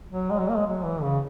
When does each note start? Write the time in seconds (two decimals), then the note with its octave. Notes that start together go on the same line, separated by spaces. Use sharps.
0.12 F#3
0.30 G#3
0.39 F#3
0.49 A#3
0.56 G#3
0.67 F#3
0.85 E3
1.03 C#3